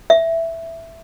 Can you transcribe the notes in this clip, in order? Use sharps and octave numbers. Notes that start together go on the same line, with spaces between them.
E5